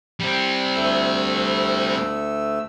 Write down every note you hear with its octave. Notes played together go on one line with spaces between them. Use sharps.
G3 C4
D2 A3 E6